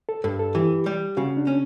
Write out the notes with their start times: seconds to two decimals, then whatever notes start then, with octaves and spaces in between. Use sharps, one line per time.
0.09 A4
0.24 G2 A4
0.39 A4
0.55 E3 G4
0.86 G3
1.17 C#3 F#4
1.37 D4
1.47 C#4